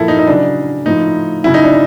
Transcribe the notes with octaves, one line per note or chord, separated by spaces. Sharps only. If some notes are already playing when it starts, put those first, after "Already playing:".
Already playing: A#2 F3 E4 A4 A#4
D#4
D#4
C#3 F#3 D4
A2 F3 D#4
C#3 F#3 E4
D#4
D4